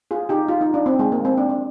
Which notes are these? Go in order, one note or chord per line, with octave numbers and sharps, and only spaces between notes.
F4 G#4
D#4 G4
F4
D#4
D4
C4
G#3
A#3
C4
D4
D4